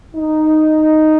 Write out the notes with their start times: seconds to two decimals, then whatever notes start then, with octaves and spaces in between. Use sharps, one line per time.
0.16 D#4